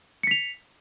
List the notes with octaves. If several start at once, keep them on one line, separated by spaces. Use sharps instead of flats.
B6 C#7 F7